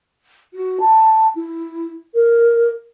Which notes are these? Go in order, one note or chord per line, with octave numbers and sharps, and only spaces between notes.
F#4
A5
E4
A#4